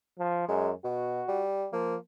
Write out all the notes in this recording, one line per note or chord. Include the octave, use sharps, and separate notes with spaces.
F3
F#2 G#3
B2 F#4
G3
F3 A#3